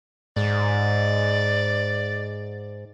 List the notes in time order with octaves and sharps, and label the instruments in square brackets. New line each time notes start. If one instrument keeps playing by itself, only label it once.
[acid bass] G#2 [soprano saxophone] D5